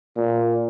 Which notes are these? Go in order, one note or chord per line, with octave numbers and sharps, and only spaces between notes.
A#2